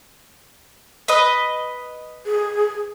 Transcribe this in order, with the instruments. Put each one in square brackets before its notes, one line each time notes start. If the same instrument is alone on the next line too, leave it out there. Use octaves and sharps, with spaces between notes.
[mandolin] B4 D#5
[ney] G#4